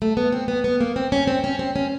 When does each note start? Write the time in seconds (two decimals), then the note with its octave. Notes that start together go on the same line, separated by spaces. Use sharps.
0.02 A3
0.17 B3
0.32 C4
0.48 B3
0.64 B3
0.81 A#3
0.96 C4
1.12 C#4
1.27 C4
1.44 C#4
1.59 C4
1.76 C#4